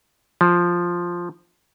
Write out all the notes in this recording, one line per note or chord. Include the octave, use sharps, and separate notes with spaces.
F3